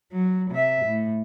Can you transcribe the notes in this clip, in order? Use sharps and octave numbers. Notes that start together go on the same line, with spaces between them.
F#3
C3 E5
A2